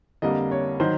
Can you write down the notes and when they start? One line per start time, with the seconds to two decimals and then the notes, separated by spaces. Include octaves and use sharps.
0.22 F2 D3 G3 A#3 D#5
0.51 C#5
0.80 D#3 F#3 C5